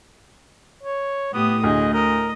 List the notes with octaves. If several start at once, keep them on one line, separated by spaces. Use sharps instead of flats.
C#5
A2 B3 G4 D#6
D2 G#4 D#5
A#4 D#5